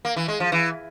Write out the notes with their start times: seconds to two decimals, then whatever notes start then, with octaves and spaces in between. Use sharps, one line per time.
0.05 A#3
0.16 E3
0.28 G#3
0.40 F3
0.52 E3